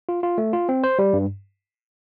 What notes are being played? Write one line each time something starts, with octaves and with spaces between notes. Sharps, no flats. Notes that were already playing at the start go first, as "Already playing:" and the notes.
F4
F4
A3
F4
C4
C5
G3
G2